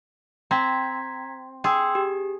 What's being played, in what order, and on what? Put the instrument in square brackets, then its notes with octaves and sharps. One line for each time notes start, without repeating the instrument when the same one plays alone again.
[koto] C4 [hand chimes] A#5 G#6 B6
[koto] G#4 [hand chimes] G5 C6 E6
[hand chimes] G4